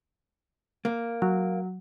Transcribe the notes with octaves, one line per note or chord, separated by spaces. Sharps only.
A#3
F#3